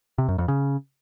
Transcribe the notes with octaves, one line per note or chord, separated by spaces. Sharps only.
C3
F#2
F2
C#3